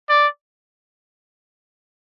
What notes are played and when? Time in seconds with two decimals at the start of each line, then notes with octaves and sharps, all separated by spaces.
0.09 D5